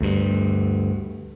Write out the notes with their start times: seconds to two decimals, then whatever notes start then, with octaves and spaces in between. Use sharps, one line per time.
0.01 D2 G2